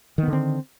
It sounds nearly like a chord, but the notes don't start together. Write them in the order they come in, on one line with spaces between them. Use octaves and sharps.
D#3 B3 D3 C4